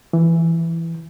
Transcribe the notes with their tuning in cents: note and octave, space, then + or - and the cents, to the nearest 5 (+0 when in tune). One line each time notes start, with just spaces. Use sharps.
E3 +10